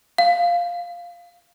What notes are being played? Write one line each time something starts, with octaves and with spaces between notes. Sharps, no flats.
F5